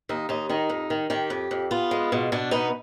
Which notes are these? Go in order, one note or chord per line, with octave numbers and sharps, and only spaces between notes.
D#2 D#4
D#2 D#4
D#3 D#4
F2
D#3
D#3 G4
F2
F2
B3 F4
G#3
B2
B2 D4
B3 D#4